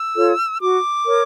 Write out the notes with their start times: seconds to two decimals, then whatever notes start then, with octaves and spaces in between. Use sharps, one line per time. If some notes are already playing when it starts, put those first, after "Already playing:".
Already playing: E6
0.16 F4 A4 C#5
0.60 F#4 D6
1.05 A#4 C#5